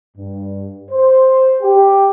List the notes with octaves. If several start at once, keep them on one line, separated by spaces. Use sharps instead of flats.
G2
C5
G4